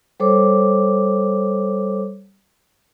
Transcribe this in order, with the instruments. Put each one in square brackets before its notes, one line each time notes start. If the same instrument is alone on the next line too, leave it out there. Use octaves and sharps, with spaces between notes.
[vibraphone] G3 A4 C5 C#5 D6